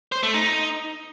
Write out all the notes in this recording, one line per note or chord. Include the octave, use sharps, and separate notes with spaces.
C5
A3
D#4